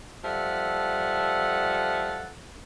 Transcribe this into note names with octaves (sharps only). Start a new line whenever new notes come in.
F3 G3 A4 E5 F#5